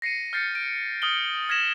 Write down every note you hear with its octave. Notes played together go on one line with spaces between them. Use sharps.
A#6 C7 C#7 D#7
F6 G6 A6 C7 C#7
D7
D#6 F6 F#7 G7
F6 G#6 A#6 B6 E7 F#7